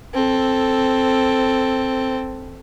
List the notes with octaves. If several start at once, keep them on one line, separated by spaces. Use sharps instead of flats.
C4 A4